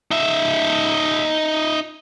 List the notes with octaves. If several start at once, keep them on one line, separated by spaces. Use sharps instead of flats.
D#4 E5